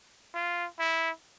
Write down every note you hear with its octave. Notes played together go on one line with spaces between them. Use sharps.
F4
E4